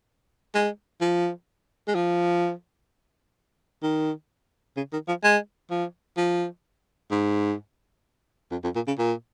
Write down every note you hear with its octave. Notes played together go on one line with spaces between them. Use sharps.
G#3
F3
G#3
F3
D#3
C#3
D#3
F3
G#3
F3
F3
G#2
F2
F2
A#2
C#3
A#2